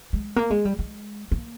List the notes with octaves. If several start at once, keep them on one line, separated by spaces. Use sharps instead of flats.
G#3
A#3
G#3
G3
G#3
A#3